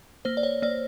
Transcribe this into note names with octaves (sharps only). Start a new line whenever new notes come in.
A#3 C5
D5
C#5
A#3 D5